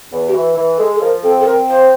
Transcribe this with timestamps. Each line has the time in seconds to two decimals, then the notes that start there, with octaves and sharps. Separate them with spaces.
0.10 E2
0.28 G4
0.33 E3 F#4
0.55 E3
0.78 G#3 A4
0.95 A4
1.00 F3 A#4
1.23 C4 A4
1.40 A4
1.45 C4 A#4
1.67 F3 C5